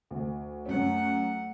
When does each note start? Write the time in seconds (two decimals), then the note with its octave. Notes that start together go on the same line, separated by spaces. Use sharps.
0.11 D2
0.66 F#2 A3 C#4 F#5